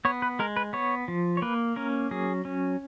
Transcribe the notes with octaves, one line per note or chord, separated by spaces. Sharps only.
B3 C#5
B4
G#3 A#4
B4
B3 C#5
F3
C#5
A#3 B4
C#4 A#4
F#3 G#4
C#4